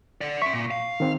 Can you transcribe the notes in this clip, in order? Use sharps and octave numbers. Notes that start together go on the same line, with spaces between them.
A4 D5
E5 C6 C#6
A#2
F5
D#3 C4